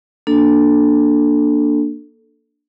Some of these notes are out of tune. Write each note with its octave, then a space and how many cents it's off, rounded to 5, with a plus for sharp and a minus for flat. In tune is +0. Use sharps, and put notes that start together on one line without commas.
A#3 +0 D4 +5 A4 +0